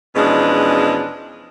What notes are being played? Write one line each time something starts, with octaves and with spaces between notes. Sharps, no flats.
E2 B2 F3 G#3 C#4 D4